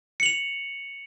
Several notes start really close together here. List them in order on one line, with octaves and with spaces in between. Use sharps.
C#7 F#7 F7